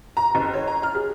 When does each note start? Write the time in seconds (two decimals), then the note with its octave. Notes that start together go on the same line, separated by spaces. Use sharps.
0.17 A#5
0.35 F#1
0.54 C#5
0.68 A#5
0.83 F6
0.95 G#4